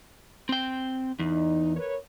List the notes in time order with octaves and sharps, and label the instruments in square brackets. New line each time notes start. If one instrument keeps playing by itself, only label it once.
[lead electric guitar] C4 G5
[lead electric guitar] E2 [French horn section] D#4
[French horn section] A#4 B4 C#5